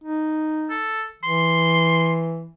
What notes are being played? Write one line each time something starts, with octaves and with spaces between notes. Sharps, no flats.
D#4
A4
E3 C6